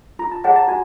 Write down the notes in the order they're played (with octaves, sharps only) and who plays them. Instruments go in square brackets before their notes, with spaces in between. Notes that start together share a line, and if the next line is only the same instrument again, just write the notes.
[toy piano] F4 [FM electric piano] A#5
[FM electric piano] A5
[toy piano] G#4 C#5 F#5 [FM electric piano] A5
[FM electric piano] A5
[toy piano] F#4 [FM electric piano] G#5